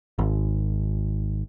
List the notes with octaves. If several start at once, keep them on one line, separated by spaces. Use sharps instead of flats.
G#1